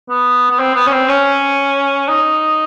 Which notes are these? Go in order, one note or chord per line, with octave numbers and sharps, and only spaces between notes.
B3
B3
C4
B3
C#4
C4
C#4
D#4